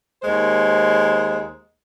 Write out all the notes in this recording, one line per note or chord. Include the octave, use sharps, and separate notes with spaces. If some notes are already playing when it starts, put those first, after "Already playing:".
D#2 G#3 C5